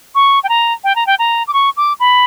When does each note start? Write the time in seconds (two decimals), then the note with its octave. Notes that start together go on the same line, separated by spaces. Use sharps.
0.15 C#6
0.43 G5
0.49 A#5
0.84 G5
0.96 A#5
1.06 G5
1.19 A#5
1.48 D6
1.53 C#6
1.77 D6
2.00 B5